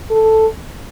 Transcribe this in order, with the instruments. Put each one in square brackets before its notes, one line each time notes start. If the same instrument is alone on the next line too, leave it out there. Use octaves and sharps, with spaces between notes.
[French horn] A4